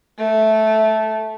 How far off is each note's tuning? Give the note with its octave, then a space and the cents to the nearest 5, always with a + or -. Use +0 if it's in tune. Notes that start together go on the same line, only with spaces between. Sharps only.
A3 -10